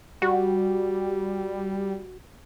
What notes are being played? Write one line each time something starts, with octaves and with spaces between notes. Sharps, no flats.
G3 F#4